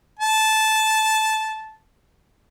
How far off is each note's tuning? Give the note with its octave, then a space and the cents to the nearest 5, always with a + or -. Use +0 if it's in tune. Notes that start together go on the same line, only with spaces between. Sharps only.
A5 -10